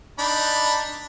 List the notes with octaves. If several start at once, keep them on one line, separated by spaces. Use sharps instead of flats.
D4 D#4 B5